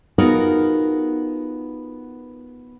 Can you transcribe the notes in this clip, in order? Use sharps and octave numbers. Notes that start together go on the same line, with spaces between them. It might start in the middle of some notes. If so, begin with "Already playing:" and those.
B3 D#4 F4 F#4 G#4 A#4